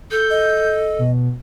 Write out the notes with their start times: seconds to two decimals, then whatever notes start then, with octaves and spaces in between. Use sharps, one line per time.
0.11 A4 G6
0.30 D#5
0.98 B2